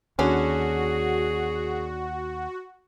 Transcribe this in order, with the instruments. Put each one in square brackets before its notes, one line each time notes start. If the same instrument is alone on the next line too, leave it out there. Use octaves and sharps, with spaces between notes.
[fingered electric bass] D#2 [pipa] D3 C#4 [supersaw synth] F#4 [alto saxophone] G#4